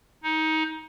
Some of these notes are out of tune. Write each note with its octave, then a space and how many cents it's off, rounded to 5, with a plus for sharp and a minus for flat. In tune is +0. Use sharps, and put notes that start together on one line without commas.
D#4 +20